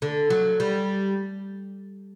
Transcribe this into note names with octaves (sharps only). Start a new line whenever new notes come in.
D3
F#3
G3